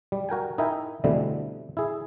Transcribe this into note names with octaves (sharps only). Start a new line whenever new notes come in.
G3
F#4 A#4 G5 G#5
D#4 E4 A#4 E5 G5 G#5
B2 D3 E3 G3 A3 C4
E4 G#4